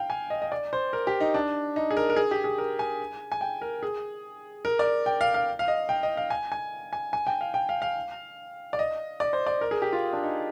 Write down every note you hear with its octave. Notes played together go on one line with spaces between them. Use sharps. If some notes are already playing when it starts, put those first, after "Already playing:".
Already playing: F5 G5
G#5
D#5
D#5
D5
C5
A#4
G4
D#4
D4
D#4
G#4
A#4
A#4
G#4
G4
G#4
A#4
G#5
G#5
G5
A#4
G#4
A#4
D5
G5
F5
F5
F5
D#5
G5
D#5
F5
G#5
G#5
G#5
G#5
G5
F5
G5
F5
F5
D5
D#5
D5
C5
D5
A#4
G#4
G4
F4
D4
D#4